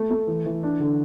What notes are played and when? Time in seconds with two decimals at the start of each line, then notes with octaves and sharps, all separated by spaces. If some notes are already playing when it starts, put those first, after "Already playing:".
Already playing: A3
0.10 A3
0.27 E3
0.46 E3
0.63 D4
0.80 D3